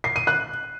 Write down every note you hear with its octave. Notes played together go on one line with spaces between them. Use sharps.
C7
D#7
F#6